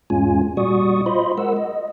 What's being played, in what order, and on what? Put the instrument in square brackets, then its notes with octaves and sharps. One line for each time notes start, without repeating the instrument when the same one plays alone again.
[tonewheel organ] E2 G#2 G#3 C#4 F4 G#5
A#2 G3 F#4 D5 C#6 D#6
F4 C5 D#5 B5 C6
G#3 A#4 F#5 E6
D#5